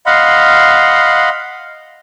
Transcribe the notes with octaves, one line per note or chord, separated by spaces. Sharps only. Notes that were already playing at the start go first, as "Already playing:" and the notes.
D#5 F5 F#5 B5 C6